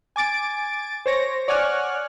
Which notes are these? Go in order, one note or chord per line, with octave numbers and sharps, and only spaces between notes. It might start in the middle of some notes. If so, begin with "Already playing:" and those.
G#5 D6 A6 D7
C5 C#5 A#6
C#5 D5 F#5 G#5 F6 F#6